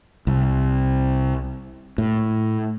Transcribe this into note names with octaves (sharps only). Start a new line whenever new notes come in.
C2
A2